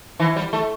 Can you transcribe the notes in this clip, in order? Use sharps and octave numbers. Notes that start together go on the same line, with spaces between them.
E3
G3
A3